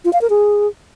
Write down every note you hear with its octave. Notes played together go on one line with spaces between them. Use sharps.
F4
F5
A#4
G#4